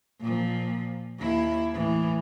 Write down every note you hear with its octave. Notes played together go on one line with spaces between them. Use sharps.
A#2 F3
D#2 E4
A2 E3